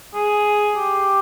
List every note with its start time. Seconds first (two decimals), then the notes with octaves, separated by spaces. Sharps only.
0.14 G#4
0.75 G4